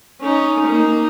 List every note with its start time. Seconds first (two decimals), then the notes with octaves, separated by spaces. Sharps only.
0.21 C#4 D#4
0.67 A#3 D#4